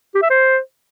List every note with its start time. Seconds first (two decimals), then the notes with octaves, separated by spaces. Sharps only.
0.15 G4
0.22 E5
0.30 C5